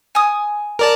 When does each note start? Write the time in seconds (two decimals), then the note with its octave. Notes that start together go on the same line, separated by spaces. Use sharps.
0.15 G#5 D#6
0.79 A#4 D5 A5